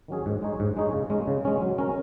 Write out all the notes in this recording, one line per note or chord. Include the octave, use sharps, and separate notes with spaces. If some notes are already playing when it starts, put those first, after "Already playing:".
D#3 F#3 C#4 G#4
G#2
G#3 D#4 G#4 C#5
G#2
G#3 D#4 G#4 C#5
C#3
G#3 C#4
C#3
G#3 C#4
F#3
C#4 A#4